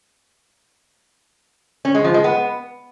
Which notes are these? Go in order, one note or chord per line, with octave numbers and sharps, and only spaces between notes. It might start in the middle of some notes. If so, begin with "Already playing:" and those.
C#4
G#3
F3
G#3
B3